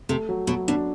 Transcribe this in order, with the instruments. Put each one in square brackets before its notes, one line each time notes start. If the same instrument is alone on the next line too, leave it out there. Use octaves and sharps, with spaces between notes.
[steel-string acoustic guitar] C3 [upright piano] A3
[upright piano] F#3
[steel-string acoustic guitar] B2 [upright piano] F#3
[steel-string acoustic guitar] B2 [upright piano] D4